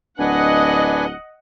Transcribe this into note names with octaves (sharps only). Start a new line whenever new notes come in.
D1 D4 B4 D#5 F#5 G#5